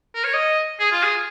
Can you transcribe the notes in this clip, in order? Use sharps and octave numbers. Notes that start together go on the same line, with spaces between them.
A#4
C#5
D#5
G#4
F4
G#4